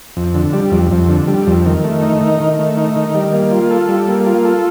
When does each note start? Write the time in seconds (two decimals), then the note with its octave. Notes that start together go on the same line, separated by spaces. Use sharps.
0.17 F2
0.34 D3
0.53 G3
0.71 F2
0.91 F2
1.09 D3
1.28 G3
1.47 F2
1.66 D#3
1.84 A3
2.02 D#4
2.21 D#3
2.40 D#3
2.59 A3
2.77 D#4
2.96 D#3
3.15 G3
3.33 A#3
3.51 F4
3.70 A4
3.89 G3
4.08 A#3
4.26 F4
4.45 A4